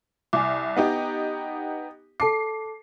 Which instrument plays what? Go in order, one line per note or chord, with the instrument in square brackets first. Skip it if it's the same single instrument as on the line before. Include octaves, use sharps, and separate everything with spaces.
[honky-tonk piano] C2 [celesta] G#5 D6
[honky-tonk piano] B3 D#4 G4
[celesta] A4 A5 D6 [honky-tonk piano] C7